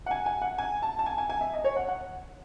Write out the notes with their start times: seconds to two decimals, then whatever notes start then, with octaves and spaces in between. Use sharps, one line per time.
0.06 F#5
0.11 G#5
0.26 G#5
0.42 F#5
0.58 G#5
0.82 A5
0.99 A5
1.06 G#5
1.18 G#5
1.30 G#5
1.41 E5
1.53 D#5
1.64 C#5
1.76 F#5
1.88 F#5